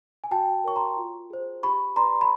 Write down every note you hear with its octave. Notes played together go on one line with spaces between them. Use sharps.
G#5
F#4 G5 A5
A#4 C#5 C#6
A#5 C6
F4
G#4 C5
G4 B5 C#6
B4 D5 A#5 C6
B5